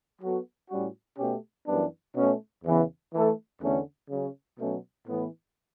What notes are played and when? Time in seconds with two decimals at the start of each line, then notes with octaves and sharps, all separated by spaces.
0.20 F#3 B3 F#4 A4
0.70 A2 G3 C#4 F#4
1.18 B2 A3 C#4 G4
1.67 F#2 E3 G3 B3 D4
2.16 B2 A3 C#4
2.64 E2 C#3 E3 B3
3.13 E3 A3 E4 A4
3.62 E2 D3 A3 C#4
4.10 C#3 F#3 C#4
4.60 B2 F#3 A3 C#4
5.08 A2 E3 B3